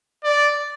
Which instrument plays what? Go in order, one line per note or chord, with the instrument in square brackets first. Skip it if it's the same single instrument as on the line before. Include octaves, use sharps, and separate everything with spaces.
[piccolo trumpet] D5